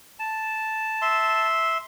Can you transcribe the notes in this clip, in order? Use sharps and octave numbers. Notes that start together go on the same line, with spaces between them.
A5
E5 C6